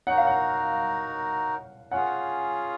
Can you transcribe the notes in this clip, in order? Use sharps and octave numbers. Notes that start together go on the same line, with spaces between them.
D#4 F#4 A#4 F#5
F5
F#5
C#4 F4 G#4 F#5